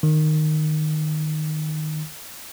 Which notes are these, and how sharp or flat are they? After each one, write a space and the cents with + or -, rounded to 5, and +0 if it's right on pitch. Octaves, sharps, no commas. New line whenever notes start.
D#3 -15